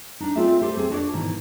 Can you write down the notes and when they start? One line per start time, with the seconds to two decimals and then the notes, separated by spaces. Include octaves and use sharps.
0.20 D4 D#4
0.35 A3 C4 F4 G#4 D5 E5
0.61 G4 A4 B4 C5
0.77 C4 G#4
0.90 D4 F#4 C#5 D5
1.13 G#2 B2 D#3 E3